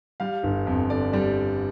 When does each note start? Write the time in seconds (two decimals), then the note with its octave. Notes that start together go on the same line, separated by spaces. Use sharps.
0.20 G3 F5
0.43 G1
0.67 F2
0.90 D3 D5
1.13 G3 D5